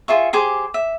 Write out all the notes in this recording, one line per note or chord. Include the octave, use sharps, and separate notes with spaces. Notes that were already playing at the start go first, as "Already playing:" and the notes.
F4 G#4 E5 C#6
G4 G#4 C5 D6
E5